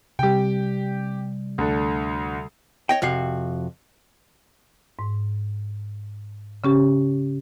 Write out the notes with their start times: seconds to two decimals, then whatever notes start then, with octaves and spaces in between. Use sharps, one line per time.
0.19 C3 G3 G4 G5
1.58 D2 D3
2.89 C#5 D#5 G5
3.02 F2 C3 F#4 F5
4.99 G#2
6.64 C#3 C#4 G4